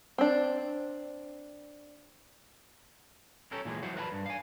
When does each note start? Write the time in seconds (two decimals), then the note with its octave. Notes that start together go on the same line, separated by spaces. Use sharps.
0.18 C4 D4
3.52 C#4 G4 A4 A#4
3.65 A#2 E3 G#3 A#3
3.83 E3 F#3 C5 F#5
3.96 A#4 B4 D#5 F#5 A5 B5
4.12 G2
4.26 F5 G#5